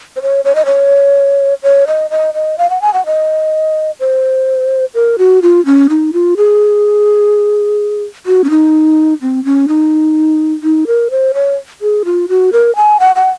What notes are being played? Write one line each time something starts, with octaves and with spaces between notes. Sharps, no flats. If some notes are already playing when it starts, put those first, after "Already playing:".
C5
C#5
C#5
D#5
C#5
C#5
D#5
D#5
D#5
F5
F#5
G#5
F#5
D#5
C5
A#4
F#4
F4
C#4
D#4
F4
G#4
F#4
C#4
D#4
C4
C#4
D#4
D#4
A#4
C5
C#5
G#4
F4
F#4
A#4
G#5
F#5
F#5